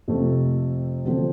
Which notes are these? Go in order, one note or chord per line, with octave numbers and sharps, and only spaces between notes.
F2 C3 A3 F4
D3 F3 C4 A4